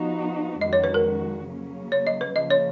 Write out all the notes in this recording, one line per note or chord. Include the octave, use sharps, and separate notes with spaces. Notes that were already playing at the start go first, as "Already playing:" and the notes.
Already playing: F3 B3 D#4 F#4
F2 D#3 G#3 C#4 F#4 D#5
C#5
B4
A#4
C#3 F#3 A#3 C#4
C#5
D#5
B4
C#3 F3 A#3 D#5
C#5